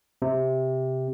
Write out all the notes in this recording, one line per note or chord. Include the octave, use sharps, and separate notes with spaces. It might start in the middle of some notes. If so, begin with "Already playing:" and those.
C3